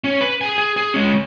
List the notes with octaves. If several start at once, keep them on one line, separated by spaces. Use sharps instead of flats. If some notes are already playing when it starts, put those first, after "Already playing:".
C#4
B4
G#4 G#5
G#4
G#4
G#3 C#4